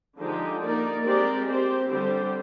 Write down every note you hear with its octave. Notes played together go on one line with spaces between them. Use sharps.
D3 F3 G#3 D#4 G4
A#3 D#4 A#4 D5
G#3 C4 G4 A#4 D5
C4 G4 C5
D3 G3 C4 G4 C5